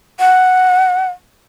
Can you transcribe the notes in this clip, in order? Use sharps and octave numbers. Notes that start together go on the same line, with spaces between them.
F#5